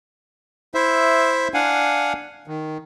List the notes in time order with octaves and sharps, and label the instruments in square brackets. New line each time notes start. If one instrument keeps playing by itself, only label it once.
[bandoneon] E4 C5 E5
D4 F5 F#5 G#5
D#3